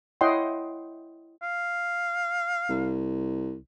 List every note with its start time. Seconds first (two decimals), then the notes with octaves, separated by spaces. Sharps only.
0.21 E4 C#5 D#5 F#5 G5 C6
1.42 F5
2.69 C2